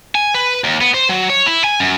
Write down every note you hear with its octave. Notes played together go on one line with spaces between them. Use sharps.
G#5
B4
D#2
B3
C5
F#3
C#5
E4
G#5
F#2